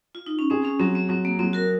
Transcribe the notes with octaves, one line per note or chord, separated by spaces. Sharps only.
F4
D#4
C#4
C4 G#4
C#4
F#3 C4
C4
F#3 C4
A#3
F#3 C4
F#4 A#4